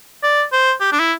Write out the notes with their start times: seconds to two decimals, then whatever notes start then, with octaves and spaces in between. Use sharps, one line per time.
0.23 D5
0.52 C5
0.81 G4
0.92 D4
0.99 E4